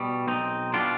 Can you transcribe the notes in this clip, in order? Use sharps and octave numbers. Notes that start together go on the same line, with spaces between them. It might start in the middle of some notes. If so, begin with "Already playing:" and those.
Already playing: B2 G3
B1 C4 D#4
B2 G3 D4 F4